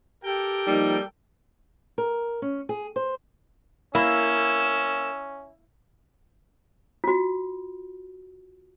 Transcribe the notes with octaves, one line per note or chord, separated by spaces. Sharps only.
G4 A4 A#4 G5
F3 G3 A#3 D#4
A#4
C#4
G#4
C5
A#3 C#4 E4 E6
F4 F#4